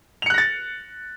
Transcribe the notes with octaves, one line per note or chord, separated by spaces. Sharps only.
F#6 A6 A#6 C#7 F7